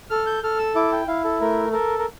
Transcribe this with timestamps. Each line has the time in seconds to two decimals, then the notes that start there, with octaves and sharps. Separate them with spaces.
0.10 A4 F6
0.26 G6
0.43 A4 F6
0.59 E6
0.75 E4 D6
0.92 G5
1.07 E4 F5
1.24 A4
1.41 A3 A#4
1.72 A4 A#4
1.99 A#4